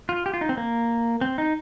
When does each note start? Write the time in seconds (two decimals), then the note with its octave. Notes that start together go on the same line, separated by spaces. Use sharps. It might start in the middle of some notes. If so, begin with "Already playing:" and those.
0.09 F4
0.26 G4
0.34 F4
0.41 D#4
0.49 C4
0.57 A#3
1.21 C4
1.38 D#4